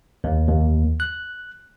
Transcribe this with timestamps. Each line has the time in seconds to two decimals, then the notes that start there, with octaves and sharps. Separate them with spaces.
0.24 D#2
0.48 D#2
1.00 F#6